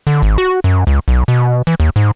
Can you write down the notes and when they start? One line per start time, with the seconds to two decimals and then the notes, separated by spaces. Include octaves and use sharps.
0.07 D3
0.22 G#1
0.38 F#4
0.64 F#2
0.87 C#2
1.08 B1
1.28 B2
1.67 E3
1.80 D#2
1.96 G#2